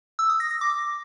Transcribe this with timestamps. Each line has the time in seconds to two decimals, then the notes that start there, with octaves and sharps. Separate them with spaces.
0.19 E6
0.29 D#6
0.40 A#6
0.51 A#6
0.61 D6